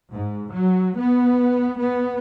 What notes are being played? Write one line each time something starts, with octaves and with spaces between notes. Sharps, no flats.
G#2
F#3
B3
B3